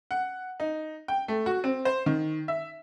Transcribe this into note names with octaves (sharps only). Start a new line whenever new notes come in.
F#5
D#4
G5
A3
F#4
C4
C5
D#3
E5